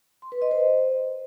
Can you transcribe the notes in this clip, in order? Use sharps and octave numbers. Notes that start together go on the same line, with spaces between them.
C6
B4
D#5
C5